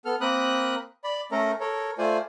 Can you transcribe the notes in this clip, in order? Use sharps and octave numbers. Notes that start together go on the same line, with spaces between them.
B3 A4 F6
A#3 C4 A#4 B5 D#6 F#6
D5 B5
A3 C#4 A4 A#4 A#5
A4 A#4 C#5
A3 F4 C5 D5 G#5